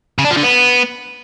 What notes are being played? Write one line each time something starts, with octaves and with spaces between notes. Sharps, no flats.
C#3
D4
F3
D3
B3